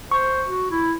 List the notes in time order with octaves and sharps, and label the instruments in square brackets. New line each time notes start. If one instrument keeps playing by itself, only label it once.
[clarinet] C5 [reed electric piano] C#6
[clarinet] F#4
E4